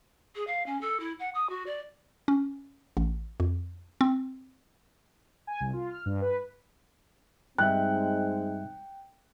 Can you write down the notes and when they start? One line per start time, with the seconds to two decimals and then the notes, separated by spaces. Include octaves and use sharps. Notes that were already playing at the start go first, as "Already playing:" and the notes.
0.35 G#4
0.47 F5
0.66 C#4
0.81 A4
0.99 E4
1.19 F#5
1.34 D#6
1.49 F#4
1.66 D5
2.28 C#4
2.97 A1
3.40 F2
4.01 C4
5.47 G#5
5.60 C2
5.73 F4
5.91 F6
6.06 G2
6.22 B4
7.58 G2 G3 G#3 C4 D#4 E5 G5 F#6